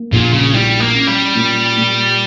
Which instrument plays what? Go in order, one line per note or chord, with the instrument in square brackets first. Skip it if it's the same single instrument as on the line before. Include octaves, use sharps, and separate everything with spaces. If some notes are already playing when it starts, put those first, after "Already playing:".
Already playing: [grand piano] A#3
[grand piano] A#1 [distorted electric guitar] A#2
[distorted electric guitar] C#3
[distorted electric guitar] G3 [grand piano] E4
[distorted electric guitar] A#3
[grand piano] C#4
[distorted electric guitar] G3
[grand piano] A#2
A#2